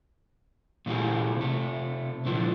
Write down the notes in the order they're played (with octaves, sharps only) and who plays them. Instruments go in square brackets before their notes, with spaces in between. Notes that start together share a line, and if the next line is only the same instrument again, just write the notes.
[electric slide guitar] A#2 E3 A3 F4 G4 G#4
C3 A3
A#2 D3 E3 F3